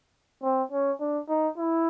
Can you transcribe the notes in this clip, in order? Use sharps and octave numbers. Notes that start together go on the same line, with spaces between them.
C4
C#4
D4
D#4
E4